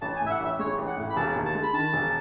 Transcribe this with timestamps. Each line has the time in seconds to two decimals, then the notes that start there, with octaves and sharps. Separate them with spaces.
0.01 A1 A5
0.17 G#5
0.21 A2
0.26 E5
0.30 F#5
0.40 A1 E5
0.59 G#3 C#5
0.78 A1
0.88 F#5
0.97 A2
1.10 B5
1.16 E1 A5
1.35 D#2
1.45 A5
1.55 G#3
1.63 B5
1.73 D#3 A5
1.93 E1